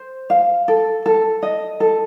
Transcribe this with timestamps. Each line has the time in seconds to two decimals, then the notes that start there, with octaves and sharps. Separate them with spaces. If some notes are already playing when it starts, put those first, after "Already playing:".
Already playing: C5
0.30 F5
0.68 A4
1.06 A4
1.43 D#5
1.80 A4